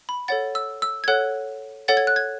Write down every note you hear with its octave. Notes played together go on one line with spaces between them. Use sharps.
B5
A4 C#5 F#5 A6
E6
E6
G#6
A4 C#5 F#5 F#6
A4 C#5 F#5 A6
G#6
F#6
G#6